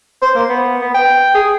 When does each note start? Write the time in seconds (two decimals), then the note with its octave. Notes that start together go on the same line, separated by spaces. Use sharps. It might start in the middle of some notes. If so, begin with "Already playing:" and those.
0.22 C5
0.35 A#3
0.49 B3
0.82 B3
0.94 G5
1.35 G#4